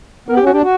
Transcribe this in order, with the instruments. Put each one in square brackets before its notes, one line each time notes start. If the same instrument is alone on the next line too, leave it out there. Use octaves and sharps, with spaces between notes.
[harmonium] B3 [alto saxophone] A#4
[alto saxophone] G4
[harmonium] C#4
[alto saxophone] F#4
[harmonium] D4 [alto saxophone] G4
[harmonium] F#4